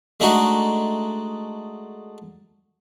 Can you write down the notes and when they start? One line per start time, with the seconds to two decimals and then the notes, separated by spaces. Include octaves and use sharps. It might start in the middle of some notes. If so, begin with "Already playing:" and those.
0.20 G#3 A3 D4 D#4 F#4